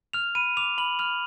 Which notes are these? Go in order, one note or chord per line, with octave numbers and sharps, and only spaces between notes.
F6 F7
B5 D#7
D6 F7
B5 F#7
F6 F7